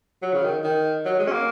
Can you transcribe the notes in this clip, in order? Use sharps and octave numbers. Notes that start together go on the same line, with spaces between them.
F#3
C#3
D#3
D#3
F#3
G#3
C#4
A#3